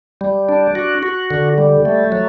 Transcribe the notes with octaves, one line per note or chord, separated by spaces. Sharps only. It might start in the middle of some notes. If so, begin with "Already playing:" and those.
G3
D4
F#4
F#4
D3
G3
A3
F#3